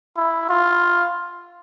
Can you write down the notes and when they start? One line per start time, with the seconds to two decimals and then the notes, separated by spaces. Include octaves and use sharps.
0.17 E4
0.49 F4